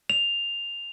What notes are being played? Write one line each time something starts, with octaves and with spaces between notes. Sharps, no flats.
F7